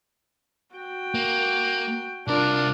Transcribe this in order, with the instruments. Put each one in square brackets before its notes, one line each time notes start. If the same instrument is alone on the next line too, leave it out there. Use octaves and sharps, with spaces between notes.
[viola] F#4 G5
[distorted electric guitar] A#3
[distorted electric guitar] C2 A#4 [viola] D4 F4